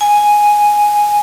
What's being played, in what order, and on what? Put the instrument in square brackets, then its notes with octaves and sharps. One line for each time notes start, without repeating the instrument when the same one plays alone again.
[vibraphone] G#5